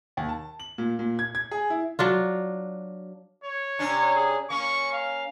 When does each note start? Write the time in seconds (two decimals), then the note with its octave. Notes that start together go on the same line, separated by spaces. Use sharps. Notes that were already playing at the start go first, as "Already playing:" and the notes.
0.17 D#2
0.29 A5
0.60 F#7
0.78 A#2
0.99 A#2
1.19 G#6
1.35 G#6
1.51 G#4
1.70 E4
1.99 F#3 D4 F4
3.44 C#5
3.79 C3 C#4 D4
4.15 G#4
4.50 A#3 C#4 C#6
4.93 F5